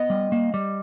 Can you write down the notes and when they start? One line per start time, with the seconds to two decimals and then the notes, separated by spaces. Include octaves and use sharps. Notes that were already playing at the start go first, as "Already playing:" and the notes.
Already playing: B3 D#5
0.10 G3
0.32 A#3
0.54 G3